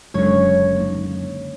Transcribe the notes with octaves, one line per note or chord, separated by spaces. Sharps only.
F#1 C#2 F#2 D3 C#5
A#3 D#4